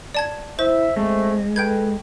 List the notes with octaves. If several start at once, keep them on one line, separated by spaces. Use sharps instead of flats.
D5 A5 G#6
E4 C5 E5
G#3 A3 C4
A4 B4 G5 G6 G#6